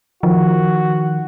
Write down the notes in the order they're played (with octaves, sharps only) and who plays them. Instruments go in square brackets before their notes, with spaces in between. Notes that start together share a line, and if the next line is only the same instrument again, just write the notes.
[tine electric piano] D#3 [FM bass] F3 [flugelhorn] F#4